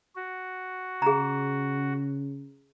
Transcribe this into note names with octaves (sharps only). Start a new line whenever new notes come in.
F#4
C#3 G#4 A#5